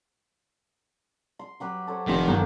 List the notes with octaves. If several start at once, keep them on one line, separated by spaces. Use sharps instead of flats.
C6
F#3 G4 B4
A4 C5 C#5
F1 D#3 C6 A#6 B6
G1 A#4